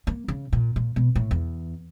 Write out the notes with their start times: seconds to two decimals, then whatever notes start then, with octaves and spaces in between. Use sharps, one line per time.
0.07 A#3
0.28 C#3
0.53 A#2
0.76 A#2
0.96 B2
1.15 A2
1.31 E2